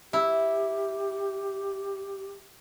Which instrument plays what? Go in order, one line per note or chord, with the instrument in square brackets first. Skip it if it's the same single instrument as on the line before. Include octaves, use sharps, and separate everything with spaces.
[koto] E4 [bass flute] G4